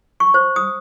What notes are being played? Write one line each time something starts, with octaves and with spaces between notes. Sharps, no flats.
C#6
C5
D#6